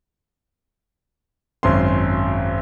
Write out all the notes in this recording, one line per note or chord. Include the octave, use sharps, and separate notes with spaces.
G#1 F#2 C#4 C6